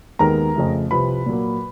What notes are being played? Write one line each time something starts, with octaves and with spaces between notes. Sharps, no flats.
D#2 D#3 G#3 B3 A#4 A#5
F2 C#3 F3 A3
C2 C3 F3 B4 B5
A#2 F#3 A#3